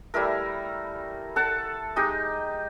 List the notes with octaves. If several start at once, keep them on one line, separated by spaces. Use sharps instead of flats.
G3 A3 E4 A#4
A4 F#5 A5
G#3 D#4 G4